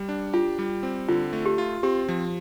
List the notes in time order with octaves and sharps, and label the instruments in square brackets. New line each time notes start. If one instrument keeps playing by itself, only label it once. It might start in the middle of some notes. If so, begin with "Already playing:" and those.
Already playing: [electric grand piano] G3
D4
[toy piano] F4 [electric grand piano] G4
[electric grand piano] G3
C4
[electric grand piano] D3 [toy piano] F4
[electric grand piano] A3
[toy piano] G4
[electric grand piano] F4
[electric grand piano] C4 [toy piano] G4
[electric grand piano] F3